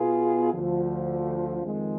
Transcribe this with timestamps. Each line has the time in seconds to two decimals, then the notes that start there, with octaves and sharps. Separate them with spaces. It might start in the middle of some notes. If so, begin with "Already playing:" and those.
Already playing: B2 B3 F4 G#4 B4
0.53 D2 D3 F3
1.63 F2 D#3 G#3